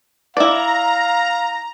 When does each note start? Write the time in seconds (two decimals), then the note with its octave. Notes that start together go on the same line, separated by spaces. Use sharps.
0.37 E4 D5 F5 A#5